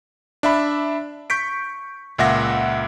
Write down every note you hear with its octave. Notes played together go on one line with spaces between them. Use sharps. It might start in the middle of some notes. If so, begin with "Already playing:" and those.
D4 E5 B5
C#6 G6 B6 D7
C#2 A#2 E5 F#5 A#6